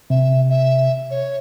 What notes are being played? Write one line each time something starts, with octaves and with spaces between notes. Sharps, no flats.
C3 E5
E5
C#5